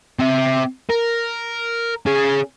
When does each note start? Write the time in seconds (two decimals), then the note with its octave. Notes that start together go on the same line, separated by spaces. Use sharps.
0.19 C4 E5
0.90 A#4
2.06 C#4 G#4